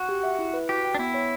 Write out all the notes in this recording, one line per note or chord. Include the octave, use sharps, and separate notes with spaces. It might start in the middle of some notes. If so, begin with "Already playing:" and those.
Already playing: F#4 F#5
G4
E5
E4
B4
F#4 G4
G5
D4
B3 E4
C#5